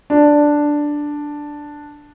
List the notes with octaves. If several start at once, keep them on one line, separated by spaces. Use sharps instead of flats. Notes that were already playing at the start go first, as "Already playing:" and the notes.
D4